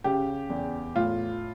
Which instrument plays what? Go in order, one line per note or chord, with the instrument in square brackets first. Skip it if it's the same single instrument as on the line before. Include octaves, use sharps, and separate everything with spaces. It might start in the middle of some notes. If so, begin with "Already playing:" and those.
[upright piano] C#3 G4
E2
A2 F4